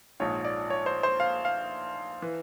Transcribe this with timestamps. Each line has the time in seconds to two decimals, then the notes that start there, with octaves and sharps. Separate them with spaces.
0.20 A#1 G#2 F3 C#5
0.45 D5
0.70 C#5
0.86 C5
1.03 C5
1.20 F5
1.45 F5
2.22 E3